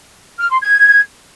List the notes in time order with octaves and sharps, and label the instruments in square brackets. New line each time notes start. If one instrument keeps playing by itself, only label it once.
[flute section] F6
C6
G#6